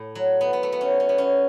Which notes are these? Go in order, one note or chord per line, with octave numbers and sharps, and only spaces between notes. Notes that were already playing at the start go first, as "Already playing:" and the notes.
Already playing: A2
F#3
B3
B3
A3
B3
C#4
C#4
B3
C#4